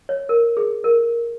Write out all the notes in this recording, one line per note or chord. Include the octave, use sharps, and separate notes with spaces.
C#5
A#4
G#4
A#4